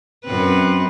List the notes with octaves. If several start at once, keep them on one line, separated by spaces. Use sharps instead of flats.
F#2 C4 B4